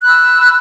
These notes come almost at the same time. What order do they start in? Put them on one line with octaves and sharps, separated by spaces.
F#6 B5 E6